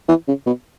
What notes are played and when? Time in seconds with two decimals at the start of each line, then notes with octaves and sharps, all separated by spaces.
0.09 E3
0.28 C#3
0.46 B2